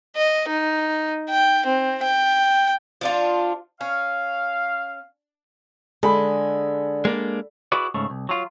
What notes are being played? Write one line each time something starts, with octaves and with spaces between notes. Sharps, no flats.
D#5
D#4
G5
C4
G5
F3 D4 F4
C#4 F5
D3 G#3 A4 B5
G#3 A#3 D4
E4 F#4 G#4 B4 D5
G#2 C#3 A3
C2
F#3 F4